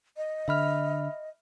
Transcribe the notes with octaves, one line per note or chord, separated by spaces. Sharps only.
D#5
D3 E5 B5 F6